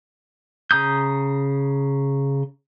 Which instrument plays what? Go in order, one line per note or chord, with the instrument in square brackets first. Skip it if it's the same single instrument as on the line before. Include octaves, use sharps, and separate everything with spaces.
[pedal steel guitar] C#3 A#5 D#6 G6